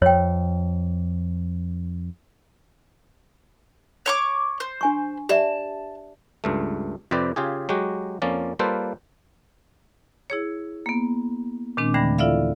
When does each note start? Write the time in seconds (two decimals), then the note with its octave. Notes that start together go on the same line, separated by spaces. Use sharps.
0.02 F2 C#5 G5
4.06 C#5 C#6 D6
4.60 C5
4.81 D4 G#5 C#6
5.29 G4 D5 E5 A5
6.44 C#2 G2 A3
7.11 F2 C3 C4 G4 B4 D5
7.36 C#3 F4 G4 G#4
7.69 F#3 G#3 F#4 G4
8.22 F2 F3 A#3 C#4 D5
8.59 G3 A#3 F4 A4 B4 C5
10.30 E4 G#4 C#5
10.86 A#3 B3
11.77 A#2 D#3 G#3 C4 D4
11.94 D#2 D3 E3 A3 B5 A#6
12.19 E4 F4 A4 D5 E5 F5